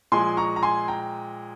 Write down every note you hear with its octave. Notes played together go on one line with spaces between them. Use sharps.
A#2 F3 G#3 G#5 C6
A#5 C#6
A#5
G#5 C6
G5 A#5